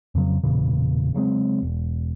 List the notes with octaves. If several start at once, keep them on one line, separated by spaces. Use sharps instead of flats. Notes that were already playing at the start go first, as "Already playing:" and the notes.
F2 C#3 F#3
E1 A#2 C#3 E3
C#3 F#3 G#3 C4
E1